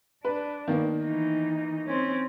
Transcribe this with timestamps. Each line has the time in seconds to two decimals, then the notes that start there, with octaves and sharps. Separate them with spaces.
0.25 D4 B4
0.68 D#3 A#3 B3
1.05 E3 D#4
1.87 C4 C#4